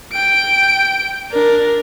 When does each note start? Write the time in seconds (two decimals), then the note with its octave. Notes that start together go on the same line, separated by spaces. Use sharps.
0.13 G5 D7
1.32 D4 A#4